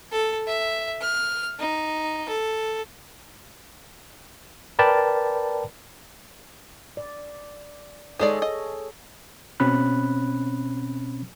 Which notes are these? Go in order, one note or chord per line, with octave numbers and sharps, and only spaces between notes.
A4
E5
F6
D#4
A4
A#4 B4 D5 G5 A5 B5
D5
D#3 G#3 G#4 A4 C#5 D5
D#5
B2 C4 C#4 B5 F#6